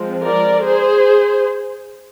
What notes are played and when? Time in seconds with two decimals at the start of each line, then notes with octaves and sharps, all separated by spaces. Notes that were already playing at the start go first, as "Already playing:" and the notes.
Already playing: F3 G#3 C4
0.24 A#4 D5
0.66 G#4 C5